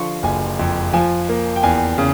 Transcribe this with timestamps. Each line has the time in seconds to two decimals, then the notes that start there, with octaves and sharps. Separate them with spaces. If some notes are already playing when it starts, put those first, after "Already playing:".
Already playing: D3 F3 C6 C#6
0.23 F#1 G#5
0.59 F2
0.93 F3 G#5
1.29 A#3
1.56 G5
1.63 E2 G#5
1.98 C#3